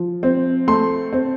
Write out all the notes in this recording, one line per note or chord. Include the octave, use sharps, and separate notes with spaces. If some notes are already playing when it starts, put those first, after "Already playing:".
Already playing: F3
C4
A3 C6
C4